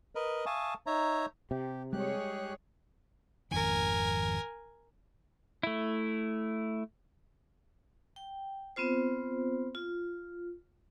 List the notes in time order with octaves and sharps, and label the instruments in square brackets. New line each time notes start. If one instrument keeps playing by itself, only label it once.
[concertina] A#4 B4 D#5
E5 F5 G#5 A5 C#6 D#6
D#4 C#5 E5 A#5
[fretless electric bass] C3 [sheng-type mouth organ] G4
[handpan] G3 G#3 [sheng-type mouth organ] G4 F#6 [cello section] G#4 C#5
[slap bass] G#1 F2 D#3 [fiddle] A#4 G#5
[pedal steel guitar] A3 E4
[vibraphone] G5
B3 C4 F4 C5
F4